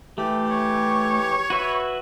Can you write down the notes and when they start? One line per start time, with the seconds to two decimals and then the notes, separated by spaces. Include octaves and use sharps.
0.18 E3 A3 G4
0.50 C#5
1.50 F#4 B4 E5